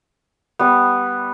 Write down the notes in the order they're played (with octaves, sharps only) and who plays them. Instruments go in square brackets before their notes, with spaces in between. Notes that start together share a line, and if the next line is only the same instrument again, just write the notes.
[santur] G3 B3